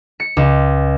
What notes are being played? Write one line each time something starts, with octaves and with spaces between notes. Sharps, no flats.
C#7
C#2